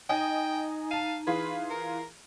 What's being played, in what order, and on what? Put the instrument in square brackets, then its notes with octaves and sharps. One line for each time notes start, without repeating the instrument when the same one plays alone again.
[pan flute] D#4 [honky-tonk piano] D#5 G#5 [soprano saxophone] G5
[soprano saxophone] F5 [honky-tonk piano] A5 D#7
[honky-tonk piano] E3 F4 G#4 [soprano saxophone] B4
[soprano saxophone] A#4